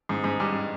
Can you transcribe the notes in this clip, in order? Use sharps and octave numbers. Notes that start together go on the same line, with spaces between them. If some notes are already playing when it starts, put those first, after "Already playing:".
G#2
G#2
G2